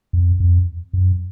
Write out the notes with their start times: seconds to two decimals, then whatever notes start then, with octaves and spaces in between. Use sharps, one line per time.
0.13 F2
0.40 F2
0.93 F#2